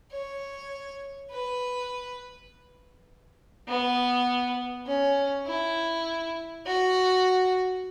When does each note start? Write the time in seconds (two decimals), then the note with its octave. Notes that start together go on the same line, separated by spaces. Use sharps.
0.11 C#5
1.31 B4
3.68 B3
4.87 C#4
5.46 E4
6.66 F#4